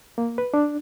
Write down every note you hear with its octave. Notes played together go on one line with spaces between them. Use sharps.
A#3
B4
D4